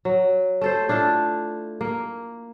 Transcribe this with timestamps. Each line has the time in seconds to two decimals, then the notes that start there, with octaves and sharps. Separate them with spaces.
0.05 F#3
0.61 A3 A4 C5
0.89 D4 E4 F4 A4
1.81 A#3